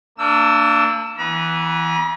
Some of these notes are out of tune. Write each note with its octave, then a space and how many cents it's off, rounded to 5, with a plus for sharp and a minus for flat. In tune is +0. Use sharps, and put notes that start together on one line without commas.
A#3 -35 D4 +0 E6 +0
E3 +0 B3 +0 A#5 +45